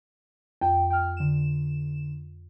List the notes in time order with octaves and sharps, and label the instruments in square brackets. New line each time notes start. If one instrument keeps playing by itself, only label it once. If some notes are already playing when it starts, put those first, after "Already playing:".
[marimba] F2 [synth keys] G5
[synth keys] G5 F6
D3 E7